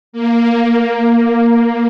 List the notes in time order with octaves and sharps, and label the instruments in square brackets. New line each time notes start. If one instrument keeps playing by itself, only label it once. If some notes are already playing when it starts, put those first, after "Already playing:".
[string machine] A#3